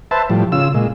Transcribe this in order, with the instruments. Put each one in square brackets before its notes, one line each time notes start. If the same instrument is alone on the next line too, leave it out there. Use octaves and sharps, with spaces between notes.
[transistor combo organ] B4 C5 E5 A5
A2 F3 G3
C#3 F4 E6
A#2 G#3